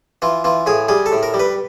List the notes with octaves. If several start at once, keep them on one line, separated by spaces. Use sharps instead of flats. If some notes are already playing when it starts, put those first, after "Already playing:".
E3 F4
E3 F4
A2 G#4
G3 G#4
A4
A2
A#4
G3
B4